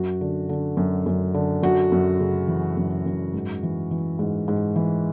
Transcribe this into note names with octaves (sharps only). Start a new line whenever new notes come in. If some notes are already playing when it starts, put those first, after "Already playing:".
Already playing: F#2 F#4
D3
D3
F#2
F#2
D3
F#2 F#4
F#2
C#3
E3
F#2
F#2
G#2
E3
E3
G#2
G#2
E3